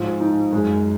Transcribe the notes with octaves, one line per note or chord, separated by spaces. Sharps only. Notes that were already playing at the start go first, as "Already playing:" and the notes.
Already playing: G#2 F3
D#4
F#2 G#3